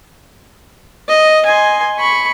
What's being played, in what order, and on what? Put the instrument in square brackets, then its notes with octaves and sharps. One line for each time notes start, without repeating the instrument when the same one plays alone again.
[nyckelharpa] D#5
G#5 C6
B5 C#6